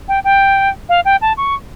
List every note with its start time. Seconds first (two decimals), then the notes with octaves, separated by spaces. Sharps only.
0.08 G5
0.24 G5
0.89 F5
1.05 G5
1.21 A5
1.37 C#6